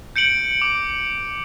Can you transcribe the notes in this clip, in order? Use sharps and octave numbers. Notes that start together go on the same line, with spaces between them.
G6 C#7 D7 F#7
D6